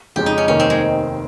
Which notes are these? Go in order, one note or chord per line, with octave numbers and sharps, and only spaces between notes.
F2 C#3 F3 G#3 G4
D#4
C#4
F1 D#2 D#3 A#3 C#4
C4
G#3